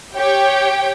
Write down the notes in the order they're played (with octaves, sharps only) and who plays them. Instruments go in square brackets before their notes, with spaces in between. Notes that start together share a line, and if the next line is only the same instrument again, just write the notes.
[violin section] G4 C#5 G5